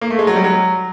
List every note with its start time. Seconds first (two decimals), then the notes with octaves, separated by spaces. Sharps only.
0.01 A#3
0.10 A3
0.19 G#3
0.27 F#3
0.36 G3
0.44 F#3